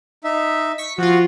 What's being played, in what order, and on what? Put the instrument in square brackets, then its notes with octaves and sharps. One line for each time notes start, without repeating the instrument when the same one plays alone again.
[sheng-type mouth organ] D#4 E5
[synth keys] C#6 B6
[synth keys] F3 F4 [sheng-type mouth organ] F#4